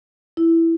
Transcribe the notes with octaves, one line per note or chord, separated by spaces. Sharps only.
E4